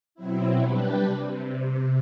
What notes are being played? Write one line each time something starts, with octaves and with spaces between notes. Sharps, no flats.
B2 F#3 C4 E4
G3 D4 G4 B4
C3